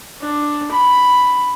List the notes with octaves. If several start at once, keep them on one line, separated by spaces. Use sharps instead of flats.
D4
B5